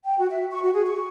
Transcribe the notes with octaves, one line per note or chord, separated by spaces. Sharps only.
G5
F#4
E5
C#6
F#4
G#4
C#6